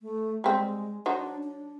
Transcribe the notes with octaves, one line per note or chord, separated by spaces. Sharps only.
A3
G3 G#3 C4
F#3 D4 D#4 C5
D4